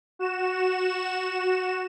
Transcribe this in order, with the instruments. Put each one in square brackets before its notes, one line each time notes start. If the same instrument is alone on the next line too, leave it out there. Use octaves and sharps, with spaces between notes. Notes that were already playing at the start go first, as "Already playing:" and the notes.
[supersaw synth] F#4 E7